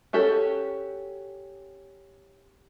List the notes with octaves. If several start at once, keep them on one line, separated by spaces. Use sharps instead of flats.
C#4 F#4 G4 A4